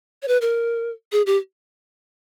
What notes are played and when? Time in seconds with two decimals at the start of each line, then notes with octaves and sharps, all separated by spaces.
0.22 C#5
0.28 B4
0.41 A#4
1.12 G#4
1.26 G4